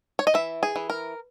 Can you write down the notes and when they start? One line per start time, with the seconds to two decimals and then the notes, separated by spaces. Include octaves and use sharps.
0.19 C#5
0.27 D#5
0.34 E3 E5
0.63 G#4
0.76 E3
0.90 A#4